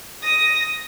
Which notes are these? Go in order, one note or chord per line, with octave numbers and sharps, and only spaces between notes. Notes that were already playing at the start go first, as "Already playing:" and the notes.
D#6 A#6